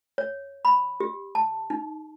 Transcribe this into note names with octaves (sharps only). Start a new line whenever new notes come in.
C#5
B5
G4
A5
D#4